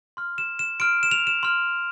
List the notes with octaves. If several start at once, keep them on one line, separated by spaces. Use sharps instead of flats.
C6 F6
E7
E7
C6 F6 D7
E7
F7
E7
C6 F6